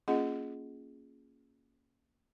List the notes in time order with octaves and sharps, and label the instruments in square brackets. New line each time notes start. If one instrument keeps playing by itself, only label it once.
[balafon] A#3 C#4 F4 G#4 D#5 F#5